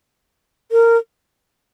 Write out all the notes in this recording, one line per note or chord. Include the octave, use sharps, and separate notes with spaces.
A#4